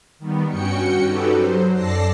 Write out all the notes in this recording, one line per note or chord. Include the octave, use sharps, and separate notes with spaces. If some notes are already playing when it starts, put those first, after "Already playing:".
D#3 G3 B3
G2 C#4 F#4 G5 C#7
C#4 D#4 F#4 G4 A4 B4
F#3 C5
F#2 A4 D5 A5 A#6 C7